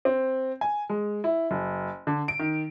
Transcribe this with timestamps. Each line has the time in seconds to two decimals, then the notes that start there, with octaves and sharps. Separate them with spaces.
0.05 C4
0.61 G#5
0.90 G#3
1.24 E4
1.51 F#1
2.07 D3
2.28 D7
2.39 D#3